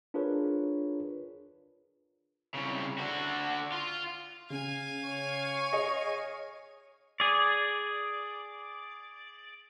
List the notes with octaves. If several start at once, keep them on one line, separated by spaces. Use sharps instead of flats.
D4 F4 G#4 A#4 B4 C#5
C2 C#3
D3 F#4
F4
C#3 F5 G#5
C#5 C#6
G#4 D#5
G#4 D5